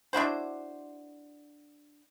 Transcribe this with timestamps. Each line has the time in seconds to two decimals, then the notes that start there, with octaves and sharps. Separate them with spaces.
0.13 D4 E4 F#4 C5